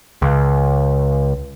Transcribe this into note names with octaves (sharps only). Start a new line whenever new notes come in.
C#2